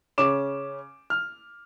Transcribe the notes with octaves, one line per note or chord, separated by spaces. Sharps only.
C#3 C#4 D6 E7
F6